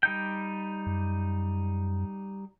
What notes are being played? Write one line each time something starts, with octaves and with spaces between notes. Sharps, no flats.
G3 D#4 G5
F#2